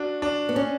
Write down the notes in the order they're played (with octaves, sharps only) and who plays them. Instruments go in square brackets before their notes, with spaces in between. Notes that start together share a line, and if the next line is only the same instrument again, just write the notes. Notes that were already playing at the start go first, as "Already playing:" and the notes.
Already playing: [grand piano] D4 F#4
D4
[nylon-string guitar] B3
[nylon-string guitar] C#4 [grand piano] D4